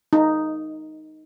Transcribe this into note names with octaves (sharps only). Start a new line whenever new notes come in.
D#4